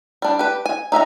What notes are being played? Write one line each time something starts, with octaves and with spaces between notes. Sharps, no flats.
G3 D4
G4 B4
G#5
D#4 E5 G#5 A#5